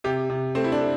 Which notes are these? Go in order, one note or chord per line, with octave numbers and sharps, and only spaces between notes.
C3 G4
C3
A3 C4
E4
D4
A3